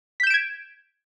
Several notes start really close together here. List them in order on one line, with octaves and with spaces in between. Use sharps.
B6 G6 E7 D7 G#6